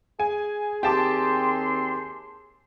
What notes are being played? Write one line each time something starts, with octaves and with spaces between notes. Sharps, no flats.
G#4 G#5
D#2 C4 G4 A5 C6 D6